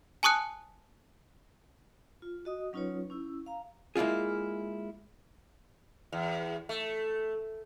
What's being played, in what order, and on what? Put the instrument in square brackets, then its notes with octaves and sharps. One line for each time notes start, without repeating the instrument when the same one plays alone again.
[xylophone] G#5 A5 C#6 D#6 F#6 C#7
[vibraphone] F4
F#4 D#5 D#6
F#3 C#4 D#4 F4 B4 C#5
C#4 E4 E6
F5 A#5
[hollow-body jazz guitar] G#3 A#3 E4 F4 G#4
[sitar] E2
A3